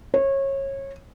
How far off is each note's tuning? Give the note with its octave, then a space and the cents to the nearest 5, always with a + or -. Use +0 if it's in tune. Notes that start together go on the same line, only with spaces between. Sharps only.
C#5 -25